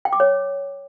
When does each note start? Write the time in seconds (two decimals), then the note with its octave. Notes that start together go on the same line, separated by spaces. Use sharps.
0.05 G5
0.13 D6
0.20 C#5